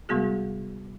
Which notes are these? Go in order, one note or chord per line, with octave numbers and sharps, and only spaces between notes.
C3 G3 G#3 B3 F#4 G#4